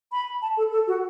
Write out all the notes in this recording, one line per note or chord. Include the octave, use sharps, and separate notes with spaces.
B5
A5
A4
A4
F#4